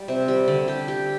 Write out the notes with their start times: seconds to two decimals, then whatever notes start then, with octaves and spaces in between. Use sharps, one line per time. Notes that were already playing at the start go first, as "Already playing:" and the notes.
Already playing: G3
0.08 C3
0.28 G3
0.48 D3
0.68 G4
0.88 G4